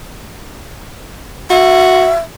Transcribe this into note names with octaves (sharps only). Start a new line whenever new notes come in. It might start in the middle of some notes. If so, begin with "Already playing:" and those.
F#4 E5